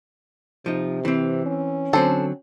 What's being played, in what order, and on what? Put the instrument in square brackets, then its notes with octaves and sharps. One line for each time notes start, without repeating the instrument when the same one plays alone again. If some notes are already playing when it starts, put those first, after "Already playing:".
[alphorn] C3 [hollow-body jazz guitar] F3 D#4
[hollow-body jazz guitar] E3 C4
[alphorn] C#4
[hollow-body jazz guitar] D3 F#3 C4 [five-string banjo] A4 C5